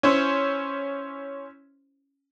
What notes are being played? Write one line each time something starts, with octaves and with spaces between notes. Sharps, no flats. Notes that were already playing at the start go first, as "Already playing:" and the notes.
C#4 E4 C5